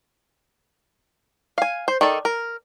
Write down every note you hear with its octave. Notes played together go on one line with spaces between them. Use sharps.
F5 G#5
C5
D#3 A4 D5
A#4